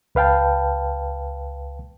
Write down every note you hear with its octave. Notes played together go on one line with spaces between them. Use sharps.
C#2 B4 F5 G5 A5